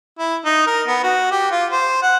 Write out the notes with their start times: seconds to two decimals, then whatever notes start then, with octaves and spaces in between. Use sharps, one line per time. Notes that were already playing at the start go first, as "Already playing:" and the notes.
0.19 E4
0.45 D#4
0.66 A#4
0.87 B3
1.03 F#4
1.31 G4
1.51 F4
1.71 C5
2.02 F#5